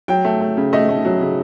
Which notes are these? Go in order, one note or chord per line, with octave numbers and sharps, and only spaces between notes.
F#3 G5
A3
A3
C#3
A3 D#5
A3
F#3
C#3